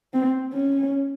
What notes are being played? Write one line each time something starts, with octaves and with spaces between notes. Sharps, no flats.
C4
C#4